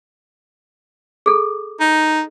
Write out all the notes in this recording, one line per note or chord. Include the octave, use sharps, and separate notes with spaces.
G#4 A4
D#4